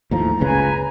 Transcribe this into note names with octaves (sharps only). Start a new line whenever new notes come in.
D#2 A2 F3 A#5
F#1 C#2 C#3 B4 G#5